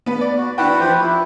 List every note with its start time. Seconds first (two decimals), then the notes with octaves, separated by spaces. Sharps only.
0.06 B3 B4
0.21 D5
0.38 F#4
0.58 D4 E4 F#4 B4 F#5 G5
0.80 F3 G4 B4 C5
1.02 E4